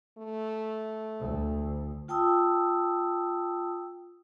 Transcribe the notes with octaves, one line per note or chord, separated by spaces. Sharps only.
A3
D2
F4 G5 A5 D#6 E6